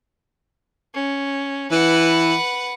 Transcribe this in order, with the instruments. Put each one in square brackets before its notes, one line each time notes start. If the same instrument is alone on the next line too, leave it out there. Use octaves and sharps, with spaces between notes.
[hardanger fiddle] C#4
[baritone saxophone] E3 [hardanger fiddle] B4 F#5